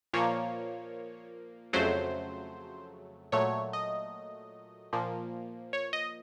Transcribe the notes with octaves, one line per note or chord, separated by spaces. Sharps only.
A#2 F3 A#3 C#5
F2 C#3 F#3 A3 C5
A#2 F#3 A3 C#5
D#5
A#2 F3 A#3
C#5
D#5